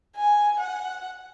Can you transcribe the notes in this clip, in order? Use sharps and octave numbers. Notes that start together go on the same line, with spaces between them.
G#5
F#5